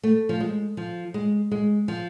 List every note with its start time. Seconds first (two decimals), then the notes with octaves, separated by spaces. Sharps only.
0.03 A3
0.29 F3
0.40 G#3
0.77 F3
1.14 G#3
1.51 G#3
1.88 F3